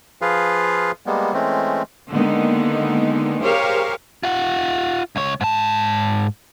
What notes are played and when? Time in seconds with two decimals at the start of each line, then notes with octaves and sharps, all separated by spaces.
0.22 F3 F4 G#4 B4 F5
1.06 G3 G#3 A#3 B3
1.34 E3 G#3 A3 C4 C#4
2.10 D3 D#3 G#3 A#3 B3 D#4
3.42 G4 G#4 A#4 C5 C#5 F5
4.23 F4 F#5
5.16 C#2 C#5
5.41 G#2 A5